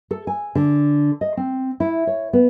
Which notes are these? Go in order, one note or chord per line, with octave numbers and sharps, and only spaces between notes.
A4
G#5
D3
D#5
C4
E4
C#5
B3